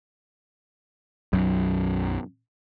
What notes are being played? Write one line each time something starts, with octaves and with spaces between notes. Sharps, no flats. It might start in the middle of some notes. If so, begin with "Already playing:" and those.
B1 F#2